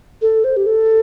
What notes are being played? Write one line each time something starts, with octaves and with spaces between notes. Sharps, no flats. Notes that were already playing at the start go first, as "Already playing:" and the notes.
A4
C5
G4
A4